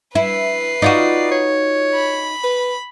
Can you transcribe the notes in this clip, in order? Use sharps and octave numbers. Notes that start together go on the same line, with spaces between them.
E4 B4 C7
D#4 F4 F#4 D5
C#5
B5
B4